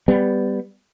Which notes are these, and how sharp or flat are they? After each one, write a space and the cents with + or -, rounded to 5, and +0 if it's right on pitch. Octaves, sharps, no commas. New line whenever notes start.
G3 +10 B3 +20